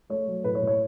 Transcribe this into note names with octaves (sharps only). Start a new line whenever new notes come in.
A3 C#5
F#3
A2 B4
C#5
A2
C#5